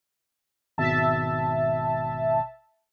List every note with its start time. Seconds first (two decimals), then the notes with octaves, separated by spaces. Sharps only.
0.78 G#1 B2 E5 A5